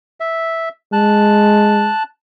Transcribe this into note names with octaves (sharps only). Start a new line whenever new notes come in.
E5
G#3 A5 F#6